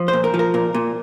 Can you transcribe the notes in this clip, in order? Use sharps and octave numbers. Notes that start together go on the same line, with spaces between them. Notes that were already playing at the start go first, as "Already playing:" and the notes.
Already playing: F3
C5
A#2
A#4
F3
A#4
A#2 A#4
A#2